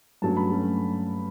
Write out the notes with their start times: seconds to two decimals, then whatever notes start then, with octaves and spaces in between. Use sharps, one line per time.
0.22 G2 F#3 A3 C#4 A5
0.37 B5
0.52 F#3 A3 C#4